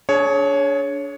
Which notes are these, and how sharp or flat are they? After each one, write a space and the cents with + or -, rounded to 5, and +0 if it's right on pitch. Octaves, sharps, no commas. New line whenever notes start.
D4 -25 G#4 +25 C#5 +0